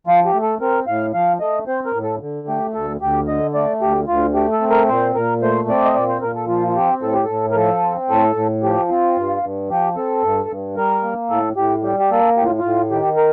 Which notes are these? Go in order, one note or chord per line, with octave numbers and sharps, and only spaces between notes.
F3 F4
G4
A3
A4
C4 A#4
A2 F5
F3 F5
A3 D#5
C4 C5
A#4
A2
A4
D3
A3 G4
D2 A4
D2 G4
D3 D#5
A3 D5
D2 G4
D2 F4
A3 G4
A4
C4
A#4
A#2 C5
A#2 A#4
A3 C5
C4 D5
D#5
A#2 D5
C5
A#2 A#4
A4
F3 F4
F4
C4 G4
A2 A4
G4
A2 A4
A#4
F3 A4
C4
A2 A4
A2
F3 G4
C4 F4
G2
G2
F3 G4
C4 A4
G2
G2
G3 A#4
A#3
A2 A4
A2 G4
G3 G4
G4
A#3 A4
A2 G4
F4
F4
A2
D#3 G4
A#4